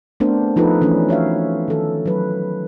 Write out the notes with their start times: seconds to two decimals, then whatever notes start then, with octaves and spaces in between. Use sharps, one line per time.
0.20 A3 B3 C4 D4 A#4 C5
0.56 F3 D#4 F4 A4 B4
0.82 E3 F3 A3 C#4 D4
1.09 F#4 C#5 E5 F5
1.68 D#3 A4
2.06 F#3 B4